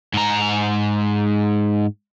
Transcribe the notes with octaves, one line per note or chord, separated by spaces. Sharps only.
G#2 A#5